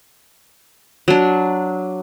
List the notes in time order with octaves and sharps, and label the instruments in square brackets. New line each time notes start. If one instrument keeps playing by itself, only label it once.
[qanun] F#3 D4